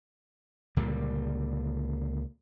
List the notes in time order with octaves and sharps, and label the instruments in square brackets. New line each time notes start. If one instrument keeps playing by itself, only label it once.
[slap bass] C#2 A#2 D3 G3